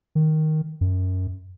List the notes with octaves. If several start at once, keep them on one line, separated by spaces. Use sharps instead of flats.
D#3
F#2